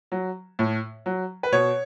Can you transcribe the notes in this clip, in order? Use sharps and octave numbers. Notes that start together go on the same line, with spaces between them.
F#3
A2
F#3
B4
B2 C#5